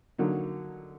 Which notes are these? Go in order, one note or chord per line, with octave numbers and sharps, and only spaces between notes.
D3 F#3 A#3 D#4